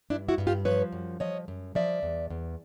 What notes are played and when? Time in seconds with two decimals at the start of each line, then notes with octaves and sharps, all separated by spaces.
0.10 G2 D4 E4
0.28 E4 F#4
0.38 G2
0.47 F4 G4
0.65 F3 B4 C#5
0.92 F#2
1.20 F3 C#5 D#5
1.48 F#2
1.75 F3 D5 E5
2.03 E2
2.30 E2